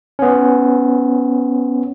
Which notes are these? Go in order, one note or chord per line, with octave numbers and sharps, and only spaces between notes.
B3 C#4